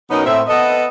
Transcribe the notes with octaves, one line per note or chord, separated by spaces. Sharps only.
B2 F#3 B3 C#4 D#4 A#4
A2 C4 E5
B3 A4 B4 D#5